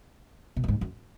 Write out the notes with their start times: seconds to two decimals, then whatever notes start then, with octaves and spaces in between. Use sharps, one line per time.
0.56 B2
0.64 F#2
0.68 G#2
0.81 F#2